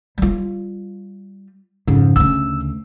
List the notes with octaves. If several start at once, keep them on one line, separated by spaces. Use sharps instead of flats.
G3 F4
F2 G#2 C#3
D2 C#3 E6